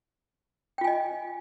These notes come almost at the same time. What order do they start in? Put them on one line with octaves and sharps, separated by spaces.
G5 F4 G#5 D#5